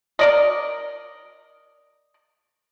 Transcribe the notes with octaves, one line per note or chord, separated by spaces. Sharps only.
A#4 D5 D#5